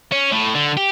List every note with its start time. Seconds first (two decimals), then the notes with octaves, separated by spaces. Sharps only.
0.12 C#4
0.32 A2
0.55 D3
0.77 G4